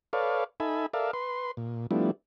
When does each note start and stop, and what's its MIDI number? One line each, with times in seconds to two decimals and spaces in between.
0.13 0.44 69
0.13 0.44 71
0.13 0.44 73
0.13 0.44 74
0.13 0.44 77
0.60 0.86 63
0.60 0.86 69
0.60 0.86 76
0.60 0.86 80
0.60 0.86 83
0.94 1.11 69
0.94 1.11 70
0.94 1.11 74
0.94 1.11 76
0.94 1.11 77
1.13 1.51 71
1.13 1.51 84
1.57 1.86 46
1.91 2.11 53
1.91 2.11 55
1.91 2.11 57
1.91 2.11 59
1.91 2.11 62
1.91 2.11 64